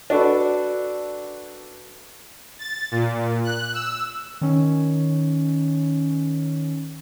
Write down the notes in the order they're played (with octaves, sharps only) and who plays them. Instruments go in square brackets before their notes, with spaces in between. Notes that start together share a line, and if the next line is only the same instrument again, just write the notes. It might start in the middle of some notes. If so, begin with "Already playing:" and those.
[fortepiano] D4 F#4 A4 B4
[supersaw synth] A6
A#2
F#6
E6
[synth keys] D#3 C#4